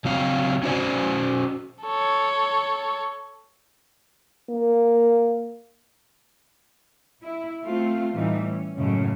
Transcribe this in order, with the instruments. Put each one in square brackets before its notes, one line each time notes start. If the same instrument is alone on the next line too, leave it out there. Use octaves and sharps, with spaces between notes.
[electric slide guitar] C#3 F#3 C4 F5
C#4 D4 F#4 C5 D5 G#5
[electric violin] A4 C#5
[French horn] A#3
[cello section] E4
A3 C4 F4
A2 E3 G3 D#4
C#4
F#2 A2 C#3 G#3 C#4